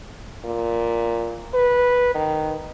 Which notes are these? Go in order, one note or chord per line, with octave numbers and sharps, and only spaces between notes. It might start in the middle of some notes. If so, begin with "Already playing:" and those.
A#2
B4
D#3